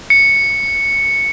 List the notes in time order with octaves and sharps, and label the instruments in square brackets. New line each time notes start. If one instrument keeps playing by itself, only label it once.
[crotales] C#7